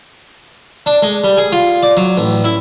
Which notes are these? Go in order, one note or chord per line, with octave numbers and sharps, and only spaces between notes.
D4
G#3
G3
G#4
F4
D5
F#3
A1
E4